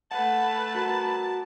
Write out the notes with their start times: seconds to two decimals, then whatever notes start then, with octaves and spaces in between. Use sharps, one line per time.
0.11 A3 B4 F#5 A5
0.75 F#4 A#4